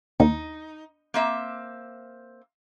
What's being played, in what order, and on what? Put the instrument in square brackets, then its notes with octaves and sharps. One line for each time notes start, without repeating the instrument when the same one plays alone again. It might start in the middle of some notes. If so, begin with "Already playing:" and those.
[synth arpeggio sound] D#2 [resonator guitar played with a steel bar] D#4
[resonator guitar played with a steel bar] A#3 C4 E5